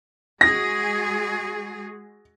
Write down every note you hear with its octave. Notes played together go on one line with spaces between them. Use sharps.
G#3 F#4 G#4 A#6